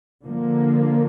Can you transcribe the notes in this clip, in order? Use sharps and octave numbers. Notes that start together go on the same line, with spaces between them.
D3 F3 A#3